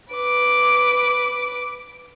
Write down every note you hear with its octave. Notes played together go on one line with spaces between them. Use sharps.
B4 D6